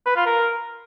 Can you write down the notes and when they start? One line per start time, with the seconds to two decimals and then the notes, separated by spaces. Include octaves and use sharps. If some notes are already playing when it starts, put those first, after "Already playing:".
0.06 B4
0.16 F4
0.26 A#4